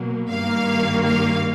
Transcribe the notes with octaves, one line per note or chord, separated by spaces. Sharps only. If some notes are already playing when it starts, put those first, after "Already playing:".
Already playing: B2 F#3 A#3
G2 D#3 G3 A#3 F5
F5